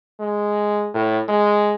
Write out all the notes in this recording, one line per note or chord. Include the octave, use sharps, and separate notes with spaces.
G#3
A2
G#3